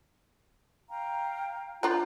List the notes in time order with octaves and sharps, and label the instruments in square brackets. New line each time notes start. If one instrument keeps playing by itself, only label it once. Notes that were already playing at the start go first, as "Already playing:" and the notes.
[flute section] F5 G5 A#5
[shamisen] F3 D4 A#5 [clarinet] F4 [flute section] G6